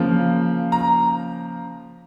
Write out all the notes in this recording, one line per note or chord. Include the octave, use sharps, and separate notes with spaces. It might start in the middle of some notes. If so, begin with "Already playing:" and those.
Already playing: C#3 F3 A#3
A#5